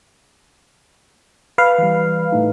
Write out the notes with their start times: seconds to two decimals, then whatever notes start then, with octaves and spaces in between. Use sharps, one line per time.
1.58 B4 F5
1.78 E3 G3
2.32 A2 A3 D#4